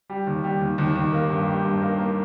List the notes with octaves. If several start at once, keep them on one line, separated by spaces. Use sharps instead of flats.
G3
D#2
G3
D#2
D#2
D#2
A#3
G2
G3
G2
A#3
A#3